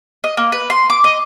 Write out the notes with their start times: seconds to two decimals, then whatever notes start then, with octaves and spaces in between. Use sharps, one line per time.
0.24 D#5
0.37 A#3
0.52 B4
0.70 C6
0.90 D6
1.04 D#5